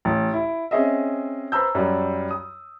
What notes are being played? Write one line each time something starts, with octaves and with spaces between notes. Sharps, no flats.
A1
E4
C4 C#4 G#4 D#5 E5
B4 C5 A5 A#5 E6 G6
F#2 G3
D#6